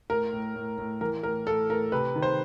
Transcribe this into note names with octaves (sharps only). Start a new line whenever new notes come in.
A2 A#4
A2
A2
A2
E3 A#4
A2 A#4
A2 A4
A2 A#4
C3 B4
D#3
C5